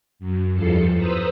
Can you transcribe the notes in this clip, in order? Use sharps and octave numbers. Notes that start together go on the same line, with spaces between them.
F#2
E2 G2 F3 A4 C7 C#7
B4 C5 A#5 D#6 E6